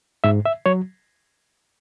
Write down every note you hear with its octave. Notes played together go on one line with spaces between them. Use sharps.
G#2 E5
E5
F#3 C#5